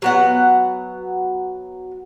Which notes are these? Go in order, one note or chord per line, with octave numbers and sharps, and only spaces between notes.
F#3 B3 F#5